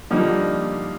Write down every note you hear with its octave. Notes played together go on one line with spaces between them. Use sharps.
D3 F3 G3 A#3 D#4